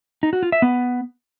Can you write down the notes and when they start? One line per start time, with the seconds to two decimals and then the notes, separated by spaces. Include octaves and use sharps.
0.23 D#4
0.33 F#4
0.43 F4
0.52 E5
0.62 B3